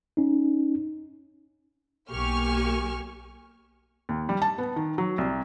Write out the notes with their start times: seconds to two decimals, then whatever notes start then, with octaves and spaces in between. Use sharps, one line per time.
0.17 C#4 D#4
2.11 B1 A#3 G4 G#5 C#6 F6
4.09 D#2
4.29 G3
4.42 A5
4.58 B3
4.76 D#3
4.98 F#3
5.18 C2